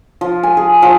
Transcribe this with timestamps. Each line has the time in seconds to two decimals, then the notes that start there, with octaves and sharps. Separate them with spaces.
0.21 F3
0.43 G#5
0.57 G#4
0.82 F3